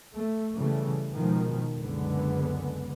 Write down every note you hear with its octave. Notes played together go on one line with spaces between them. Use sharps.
A3
C#3 E3 G3 A3
B2 D#3 F3 G#3
F#1 C#2 D3 G#3 B3